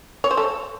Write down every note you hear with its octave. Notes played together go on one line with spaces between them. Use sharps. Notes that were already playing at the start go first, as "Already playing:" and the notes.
C#5
C5
A4